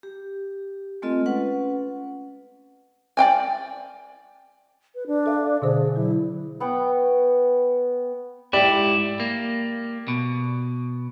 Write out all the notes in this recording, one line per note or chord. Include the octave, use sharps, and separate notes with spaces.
G4
G#3 A3 C4 F4 A4 D#5
C#4 B4 F#5
D5 F5 G5 G#5
B4
D4
A4 E5 F5
B2 D3 G#4 C5
F#3 E4
B3 F#5 G5 C#6
G#2 E4 G4 D5
A#3
B2